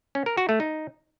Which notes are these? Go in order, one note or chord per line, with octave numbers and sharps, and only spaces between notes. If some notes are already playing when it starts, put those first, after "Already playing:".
C#4
A#4
F#4
A3
D#4